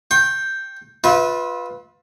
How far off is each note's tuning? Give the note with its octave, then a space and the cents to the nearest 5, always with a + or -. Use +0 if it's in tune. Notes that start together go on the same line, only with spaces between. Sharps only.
G5 +0 C#6 -45
F4 +20 B4 +0 E5 -30